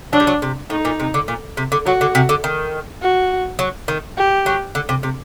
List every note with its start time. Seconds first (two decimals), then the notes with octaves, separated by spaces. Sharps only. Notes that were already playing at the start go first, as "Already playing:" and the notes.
0.13 F#3 D4
0.20 G3
0.27 F#3
0.42 C3
0.70 A2 D#4
0.85 A#2
1.00 C3
1.14 D3
1.28 A#2
1.57 C3
1.72 D3
1.86 F#3 F#4
2.01 D3
2.15 C3
2.29 D3
2.44 D#3
3.02 F#4
3.59 F#3
3.88 D#3
4.17 G4
4.46 F#3
4.75 D3
4.89 C3
5.03 C3